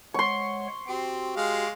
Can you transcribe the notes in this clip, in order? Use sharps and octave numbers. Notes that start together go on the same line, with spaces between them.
G#3 C#5 F#5 C6 C#6
C4 F#4 G4 G5
G#3 F5